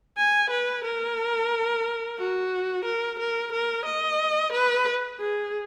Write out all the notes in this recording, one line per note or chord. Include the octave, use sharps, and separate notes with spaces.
G#5
B4
A#4
F#4
A#4
A#4
A#4
D#5
B4
G#4